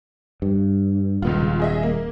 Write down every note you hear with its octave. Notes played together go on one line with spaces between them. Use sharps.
G2
D#1 C#2 B3 F4
G#4 D#5 E5
A#3